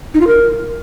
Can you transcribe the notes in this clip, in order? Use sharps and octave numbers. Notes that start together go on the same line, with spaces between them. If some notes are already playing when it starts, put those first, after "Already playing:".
D#4
F4
A#4